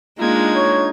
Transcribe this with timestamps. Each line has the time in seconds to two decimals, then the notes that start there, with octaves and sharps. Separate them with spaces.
0.19 G#3 A#3 D4 D#4 F4 G#6
0.55 C#5